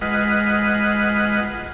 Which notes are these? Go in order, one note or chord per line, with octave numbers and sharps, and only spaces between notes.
G#3 F4 B4 D#5 F#5